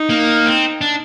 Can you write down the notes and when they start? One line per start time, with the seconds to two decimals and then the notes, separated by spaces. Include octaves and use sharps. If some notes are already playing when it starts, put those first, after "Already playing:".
Already playing: D#4
0.09 A#3
0.46 C4
0.81 D4